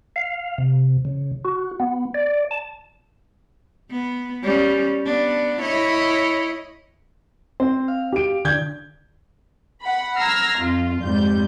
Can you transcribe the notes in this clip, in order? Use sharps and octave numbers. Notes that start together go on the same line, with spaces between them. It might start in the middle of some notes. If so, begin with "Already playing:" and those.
F5
C3
C#3
F#4
B3
D5
A5
B3
G3 C#4
B3 D4
E4 C#5 D#5
C4 C5
F5
G4 D7
D3 G6 G#6
F#5 B5
A#5 E6 F6 G#6 A#6 C7
F2 F4
F2 G#2 G3 G6